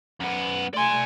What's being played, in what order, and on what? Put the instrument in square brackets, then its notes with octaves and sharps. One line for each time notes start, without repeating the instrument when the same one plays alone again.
[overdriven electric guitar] F#2 B3
[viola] A3 G#5 [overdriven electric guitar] D5 C6